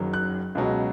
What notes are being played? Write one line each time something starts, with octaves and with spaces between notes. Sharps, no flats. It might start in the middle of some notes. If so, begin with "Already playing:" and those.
Already playing: F#1 F#2 D#3 F#3
F#6
C#2 B2 F#3